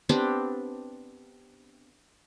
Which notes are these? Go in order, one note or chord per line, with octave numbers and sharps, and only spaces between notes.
B3 C4 D4 G4